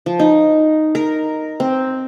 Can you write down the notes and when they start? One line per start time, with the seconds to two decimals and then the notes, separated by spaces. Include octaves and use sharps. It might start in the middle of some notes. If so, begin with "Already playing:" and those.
0.06 F3
0.19 D#4
0.95 A#4
1.60 C4